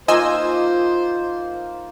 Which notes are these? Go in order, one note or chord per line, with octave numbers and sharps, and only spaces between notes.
A#3 D#4 F4 C5 D#5 G#5 E6